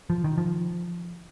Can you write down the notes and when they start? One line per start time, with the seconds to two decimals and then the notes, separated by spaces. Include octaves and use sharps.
0.10 F3
0.24 D#3
0.38 F3